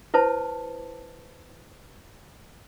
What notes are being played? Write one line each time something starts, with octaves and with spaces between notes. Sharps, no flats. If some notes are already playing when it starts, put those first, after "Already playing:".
E4 B4 C5 A5